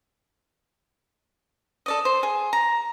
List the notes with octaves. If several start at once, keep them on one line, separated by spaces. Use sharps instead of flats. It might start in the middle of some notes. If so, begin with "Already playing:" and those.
A4 D5 D#5
C5
G#4
A#5